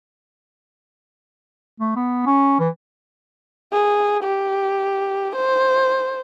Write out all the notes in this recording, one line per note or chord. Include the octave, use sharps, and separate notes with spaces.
A3
B3
C#4
E3
G#4
G4
C5